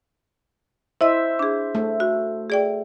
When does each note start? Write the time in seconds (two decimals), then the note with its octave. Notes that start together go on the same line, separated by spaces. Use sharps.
1.01 E4 C5 D#5 E5
1.39 D4 G#4
1.75 A3
2.00 F#4
2.50 G#4 D5 G5